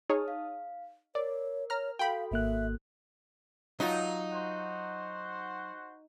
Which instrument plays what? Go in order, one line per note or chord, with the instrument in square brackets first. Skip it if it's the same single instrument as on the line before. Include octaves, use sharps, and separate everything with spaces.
[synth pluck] D#4 G#4 C#5 [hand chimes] A5 D#6 F6
[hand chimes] F5
[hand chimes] A#4 [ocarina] C#5 [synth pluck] D5
[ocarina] C#5 [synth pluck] A#5 F6
[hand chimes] F#4 A4 [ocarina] F5 [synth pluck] G5 B5
[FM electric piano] G#1 A#3 F#6 [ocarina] E5
[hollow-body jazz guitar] F#3 F4 [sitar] D#4
[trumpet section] F#4 C5 F#5